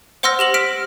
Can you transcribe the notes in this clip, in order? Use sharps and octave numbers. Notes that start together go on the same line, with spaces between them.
C5 F#5 C6 E6 F6 A#6
G4 E7 F#7
F6 B6 D7